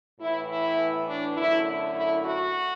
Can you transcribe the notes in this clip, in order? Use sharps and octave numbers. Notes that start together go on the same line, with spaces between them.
A2 E3 B3 E4
E4
D4
F#2 D3 A3 E4
E4
F#4